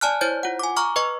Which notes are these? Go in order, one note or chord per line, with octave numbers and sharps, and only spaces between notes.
D5 G#5 A5 F6 F#6
E4 C5 C#5 G6
F4 F#5
G#5 D6
A#5 C#6 D6 F6
B4 D#5 C#6